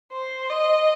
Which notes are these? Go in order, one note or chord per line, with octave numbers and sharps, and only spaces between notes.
C5
D#5